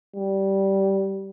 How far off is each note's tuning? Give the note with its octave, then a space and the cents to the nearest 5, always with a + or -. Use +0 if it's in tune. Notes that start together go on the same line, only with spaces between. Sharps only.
G3 -15